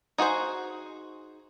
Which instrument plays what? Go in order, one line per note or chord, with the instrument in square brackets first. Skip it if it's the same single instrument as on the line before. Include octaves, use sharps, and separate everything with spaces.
[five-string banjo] D#4 F#4 G#4 C5